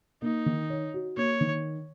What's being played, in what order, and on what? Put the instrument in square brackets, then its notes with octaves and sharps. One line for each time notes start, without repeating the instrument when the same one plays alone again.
[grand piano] A#3 [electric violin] D#4
[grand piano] D#3
C#5
F#4
[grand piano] A#3 [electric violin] C#5
[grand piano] D#3